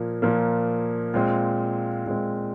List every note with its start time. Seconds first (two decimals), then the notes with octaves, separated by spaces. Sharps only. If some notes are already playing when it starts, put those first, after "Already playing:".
Already playing: A#2 F3 A#3
0.22 A#2 F3 A#3
1.14 A#2 G#3 C4 F5
2.06 A#2 G#3 C4